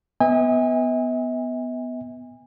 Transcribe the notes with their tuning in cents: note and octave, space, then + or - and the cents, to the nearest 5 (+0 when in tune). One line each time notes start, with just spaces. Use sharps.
B3 +5 E5 -45 G#5 -30